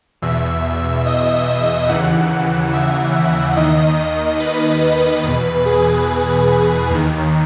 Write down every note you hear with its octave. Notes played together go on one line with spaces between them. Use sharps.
E2 B2 E5
D#5
E5
D#2 C#3 E3 F#5
E5
D#2 D#3 D#5
B4
E2 B2 B4
G#4
G#4
D#2 D#3